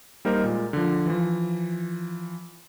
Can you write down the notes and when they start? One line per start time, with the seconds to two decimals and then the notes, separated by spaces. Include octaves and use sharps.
0.25 G3 A#3 D#4 A#4 C5
0.44 A#2 G#3
0.73 D3 F3
1.06 E3 F3